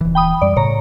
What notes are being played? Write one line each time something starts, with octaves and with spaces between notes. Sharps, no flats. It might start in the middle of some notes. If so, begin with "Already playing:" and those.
D#1 E3
G5 B5 D#6
F#2 G3 D5
A2 C#3 C#5 A#5